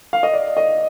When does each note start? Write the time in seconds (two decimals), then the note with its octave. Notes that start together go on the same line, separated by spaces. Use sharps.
0.13 F5
0.23 D#5
0.34 D5
0.57 D#5